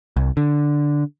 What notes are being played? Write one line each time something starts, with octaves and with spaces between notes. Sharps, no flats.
C2
D3